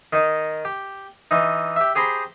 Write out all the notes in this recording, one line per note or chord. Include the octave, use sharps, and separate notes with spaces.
D#3 D#4
G4
E3 D#4
G4 E5
G4 G#4 C5 A#5 B5